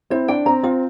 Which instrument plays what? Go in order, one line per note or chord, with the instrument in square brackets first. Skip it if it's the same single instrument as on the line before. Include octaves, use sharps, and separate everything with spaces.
[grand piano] C4 E4 [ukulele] C5
[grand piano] D4 [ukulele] G5
[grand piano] C4 [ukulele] A#5
[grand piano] C4 [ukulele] F4